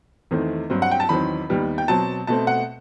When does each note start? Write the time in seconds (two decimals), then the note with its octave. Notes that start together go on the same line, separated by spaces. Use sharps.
0.31 E2 D#3 A3 C4
0.70 G2 F#3 C4
0.82 F#5
0.91 G5
1.00 A5
1.09 E2 D#3 F#3 C4 B5
1.49 D#2 D#3 G3 B3
1.78 G5
1.88 B2 F#3 C4 A5
2.27 B2 A3 C4 A5
2.47 F#5